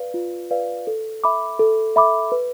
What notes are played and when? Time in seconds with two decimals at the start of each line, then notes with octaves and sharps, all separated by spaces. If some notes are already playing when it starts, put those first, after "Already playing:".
Already playing: B4 D5 F5
0.14 F4
0.51 B4 D5 F5
0.87 A4
1.24 E5 B5 D6
1.59 A4
1.96 E5 B5 D6
2.32 B4